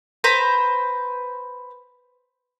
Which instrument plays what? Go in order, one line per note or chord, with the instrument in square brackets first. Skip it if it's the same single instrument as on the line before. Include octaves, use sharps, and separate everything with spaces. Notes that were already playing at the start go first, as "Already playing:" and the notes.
[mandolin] B4 C5 A#5